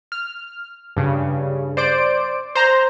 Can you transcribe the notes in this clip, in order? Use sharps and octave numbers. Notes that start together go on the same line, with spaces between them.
F6
G2 C#3
C5 D5 D7
C5 A#5